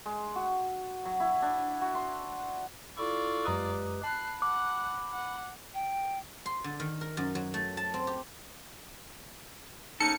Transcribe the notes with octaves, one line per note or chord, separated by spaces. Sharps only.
G#3
F#4
F#3
E4
D4
F#4
C6
E4 F4 A4 D5 C#6
F#2 G#3 G4 B4 A#5 D#6
A5 B5 F#6 C7
F#5 D6 F#6
F#5
G5
C6
D3
D#3
A#4
F#2
F#3
A3
A5
C4
G4
A#3 C#4 D#4 A4 C#7